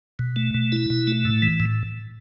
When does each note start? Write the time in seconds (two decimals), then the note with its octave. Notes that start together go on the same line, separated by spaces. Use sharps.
0.19 B2
0.36 A3
0.54 B2
0.72 E4
0.90 B2
1.07 A3
1.25 A2
1.42 E3
1.60 A2